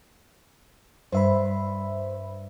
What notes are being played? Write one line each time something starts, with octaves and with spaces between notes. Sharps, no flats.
G2 C5 E5 B5